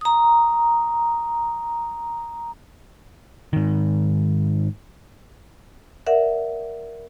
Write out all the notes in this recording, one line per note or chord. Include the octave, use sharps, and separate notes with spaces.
A#5 D#6
G#2 D#3
A#4 D5 E5 F#5